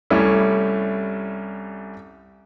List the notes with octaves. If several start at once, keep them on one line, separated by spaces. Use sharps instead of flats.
C2 G3 A3 C#4 E4